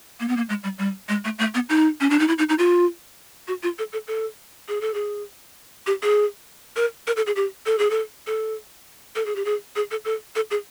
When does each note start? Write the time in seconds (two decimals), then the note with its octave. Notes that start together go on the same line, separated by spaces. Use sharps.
0.20 A#3
0.28 B3
0.37 A#3
0.49 G#3
0.64 G3
0.79 G3
1.09 G#3
1.25 A3
1.39 A3
1.54 B3
1.69 D#4
2.01 C#4
2.10 D4
2.19 D#4
2.28 E4
2.38 D#4
2.49 D#4
2.59 F4
3.48 F#4
3.63 F4
3.79 A4
3.93 A4
4.08 A4
4.68 G#4
4.81 A4
4.94 G#4
5.87 G4
6.03 G#4
6.76 A#4
7.07 A#4
7.17 A4
7.27 G#4
7.36 G4
7.66 A4
7.79 G#4
7.90 A4
8.27 A4
9.15 A4
9.26 G#4
9.36 G4
9.45 G#4
9.76 G#4
9.91 A4
10.05 A4
10.36 A4
10.51 G#4